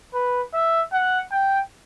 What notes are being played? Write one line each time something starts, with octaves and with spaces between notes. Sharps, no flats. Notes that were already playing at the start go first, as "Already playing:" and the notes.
B4
E5
F#5
G5